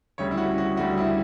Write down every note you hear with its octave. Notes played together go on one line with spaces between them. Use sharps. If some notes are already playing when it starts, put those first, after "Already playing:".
D2 C#3 G3 C#5
E4
F#4
F#4
D2 C#3 G3 F#4
E4